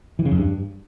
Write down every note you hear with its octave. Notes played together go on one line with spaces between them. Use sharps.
E3
C#3
F2
G2